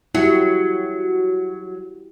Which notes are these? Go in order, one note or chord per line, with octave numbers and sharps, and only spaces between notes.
F#3 E4 F#4 G4